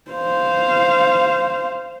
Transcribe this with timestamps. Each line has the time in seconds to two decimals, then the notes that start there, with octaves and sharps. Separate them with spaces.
0.11 C5 F5